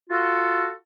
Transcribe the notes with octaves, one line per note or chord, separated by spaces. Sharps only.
F4 F#4 A4